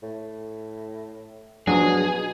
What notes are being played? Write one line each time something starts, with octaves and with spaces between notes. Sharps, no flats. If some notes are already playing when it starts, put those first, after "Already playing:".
A2
B2 F3 F#3 D4 G#4